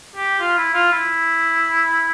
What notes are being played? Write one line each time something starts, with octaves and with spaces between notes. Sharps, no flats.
G4
F4
E4
F4
E4